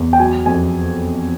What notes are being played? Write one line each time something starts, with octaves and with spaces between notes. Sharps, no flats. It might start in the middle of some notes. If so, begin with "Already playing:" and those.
Already playing: E2
G5
F#3 G#5
F2 G#5